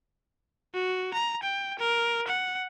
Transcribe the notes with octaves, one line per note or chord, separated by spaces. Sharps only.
F#4
A#5
G5
A#4
F#5